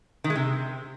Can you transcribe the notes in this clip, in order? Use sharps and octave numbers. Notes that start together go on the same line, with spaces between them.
D#3
G#3
C3